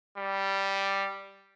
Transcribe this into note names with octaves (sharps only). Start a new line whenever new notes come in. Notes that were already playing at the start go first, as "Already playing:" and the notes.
G3